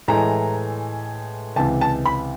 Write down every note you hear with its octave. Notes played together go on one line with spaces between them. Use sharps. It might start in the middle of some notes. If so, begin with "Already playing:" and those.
A2 E3 G#3 A#5
C#2 C3 E3 A5
A5
B5